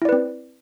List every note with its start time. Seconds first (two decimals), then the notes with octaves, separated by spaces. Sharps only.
0.02 E4
0.05 D5
0.09 B4
0.12 C4